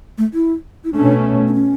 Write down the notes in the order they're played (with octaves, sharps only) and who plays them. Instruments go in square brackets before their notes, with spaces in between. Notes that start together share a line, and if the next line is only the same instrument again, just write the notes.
[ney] A3
E4
E4
[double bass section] B2 A3 C#4 [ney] D4
[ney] D4
C#4